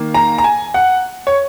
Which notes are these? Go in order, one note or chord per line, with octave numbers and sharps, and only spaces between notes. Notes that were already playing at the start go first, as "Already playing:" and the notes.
Already playing: D#3 A#3
A#5
A#5
G#5
F#5
C#5